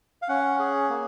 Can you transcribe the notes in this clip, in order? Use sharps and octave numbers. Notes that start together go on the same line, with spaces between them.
F5
C#4 F#5
G#4
A#3